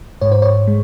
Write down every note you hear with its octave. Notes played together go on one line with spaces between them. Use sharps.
G#2 C#5
C5
C#5
G#3